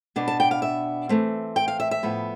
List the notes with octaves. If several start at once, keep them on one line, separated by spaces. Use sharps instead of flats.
B2 B3 D4
A5
G5
F5
E5
E3 A3 C4
G5
F5
E5
E5
A2 F3 B3